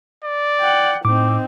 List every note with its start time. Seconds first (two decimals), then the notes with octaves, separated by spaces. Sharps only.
0.24 D5
0.60 F#5 G5
1.05 A2 C4 D#4 D6